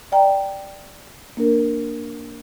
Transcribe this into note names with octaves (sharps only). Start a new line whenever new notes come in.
D5 G5 A#5
A#3 D4 A#4